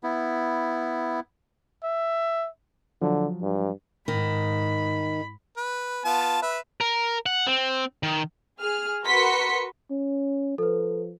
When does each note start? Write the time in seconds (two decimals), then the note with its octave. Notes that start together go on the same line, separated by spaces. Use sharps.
0.03 B3 E4
1.84 E5
3.02 D3 F3 F#3
3.42 G2
4.08 G#2 D#3 B5
5.57 B4
6.05 B3 F4 A5
6.42 B4 E5
6.81 A#4
7.26 F#5
7.47 C4
8.03 D#3
8.61 G#4 F6
9.05 F#4 A#4 B4 C6 B6 C#7
9.91 C#4
10.58 F3 A4 B4